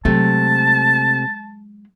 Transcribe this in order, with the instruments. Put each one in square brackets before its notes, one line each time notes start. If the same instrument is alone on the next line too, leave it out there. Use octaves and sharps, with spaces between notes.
[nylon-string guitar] C3 A3 [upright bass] F#3 G#3 [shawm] A5